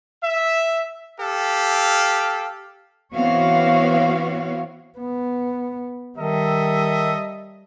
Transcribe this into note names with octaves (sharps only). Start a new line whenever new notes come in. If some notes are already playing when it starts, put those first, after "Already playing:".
E5
G4 A4 F5
E3 B3 C4 F#4 C#5 F5
B3
D#3 G3 A4 D#5 E5